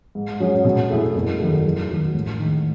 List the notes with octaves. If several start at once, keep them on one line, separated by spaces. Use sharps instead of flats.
G#2
F#3 C#4 G#4
B2
A3 E4 G#4
F#1
E2 D#3 F#3 A3
F#2
D#3 F#3
A1
G#2 D#3